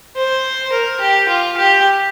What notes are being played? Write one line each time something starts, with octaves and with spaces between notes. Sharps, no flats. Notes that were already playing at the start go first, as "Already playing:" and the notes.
C5
A#4
G4
F4
G4